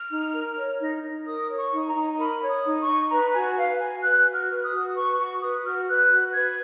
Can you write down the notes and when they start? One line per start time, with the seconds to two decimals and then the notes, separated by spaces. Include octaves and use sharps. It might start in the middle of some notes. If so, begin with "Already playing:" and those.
Already playing: F6
0.10 D#4
0.33 A#4
0.57 C#5
0.80 D#4
1.03 D#4
1.26 A#4 D#6
1.50 C#5
1.56 C#6
1.72 D#4
1.88 A#5
1.95 D#4
2.18 A#4 B5
2.42 C#5
2.49 D#6
2.64 D#4
2.80 C#6
2.87 D#4
3.11 B4 A#5
3.34 F#4 G#5
3.57 B4 F5
3.80 F#4 G#5
4.03 B4 F#6
4.27 F#4
4.34 F6
4.50 B4
4.64 D#6
4.72 F#4
4.95 B4 C#6
5.18 F#4 C#6
5.42 B4 D#6
5.65 F#4 F6
5.88 B4 F#6
6.11 F#4
6.34 B4 G#6